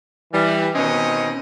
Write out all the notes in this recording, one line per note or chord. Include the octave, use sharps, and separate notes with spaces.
E3 G3
B2 D#3 C4 C#4 D#5